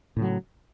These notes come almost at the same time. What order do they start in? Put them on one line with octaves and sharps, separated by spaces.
A2 C#3 F#3